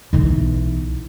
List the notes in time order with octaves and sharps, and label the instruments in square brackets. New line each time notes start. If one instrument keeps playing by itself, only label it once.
[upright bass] B1 E3